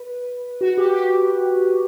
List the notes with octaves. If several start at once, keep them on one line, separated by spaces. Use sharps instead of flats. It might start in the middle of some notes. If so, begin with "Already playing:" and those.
Already playing: B4
F#4
G4
G4